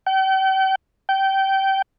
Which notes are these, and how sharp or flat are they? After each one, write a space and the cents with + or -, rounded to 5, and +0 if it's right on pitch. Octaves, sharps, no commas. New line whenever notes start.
G5 -40
G5 -20